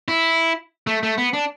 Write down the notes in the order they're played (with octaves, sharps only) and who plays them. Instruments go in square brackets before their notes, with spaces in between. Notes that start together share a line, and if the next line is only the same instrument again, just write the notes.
[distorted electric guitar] E4
A3
A3
B3
D4